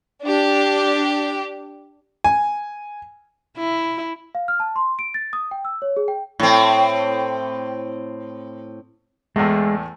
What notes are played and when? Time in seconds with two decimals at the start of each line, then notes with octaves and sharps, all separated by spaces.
0.23 D4 G4
2.24 G#5
3.58 E4
4.35 F5
4.48 F6
4.60 A5
4.76 C6
4.99 D7
5.14 A6
5.33 D#6
5.51 G5
5.65 E6
5.82 C#5
5.97 G#4
6.08 G5
6.40 A2 C4
9.36 E2 A2 G#3 A3